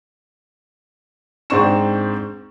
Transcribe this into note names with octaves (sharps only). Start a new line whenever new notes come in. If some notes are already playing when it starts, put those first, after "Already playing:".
G#2 C4 D4 C#6 E7